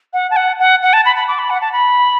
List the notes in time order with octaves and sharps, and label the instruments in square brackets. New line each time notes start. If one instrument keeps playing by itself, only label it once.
[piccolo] F#5
A5
F#5
F#5
F#5
A5
B5
B5
D6
B5
F#5
A5
B5